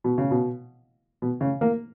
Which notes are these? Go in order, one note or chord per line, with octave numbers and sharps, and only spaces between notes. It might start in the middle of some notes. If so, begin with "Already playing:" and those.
B2
C#3
B2
B2
C#3
A#3